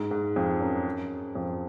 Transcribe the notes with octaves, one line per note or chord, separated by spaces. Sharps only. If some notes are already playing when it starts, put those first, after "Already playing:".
Already playing: G#2
G#2
F2
F#2
F2